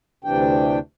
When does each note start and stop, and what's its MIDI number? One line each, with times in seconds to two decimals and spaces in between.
0.24 0.79 38
0.24 0.79 48
0.24 0.79 52
0.24 0.79 62
0.24 0.79 79